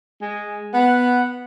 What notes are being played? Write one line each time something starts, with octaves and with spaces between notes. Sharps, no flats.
G#3
B3 F#5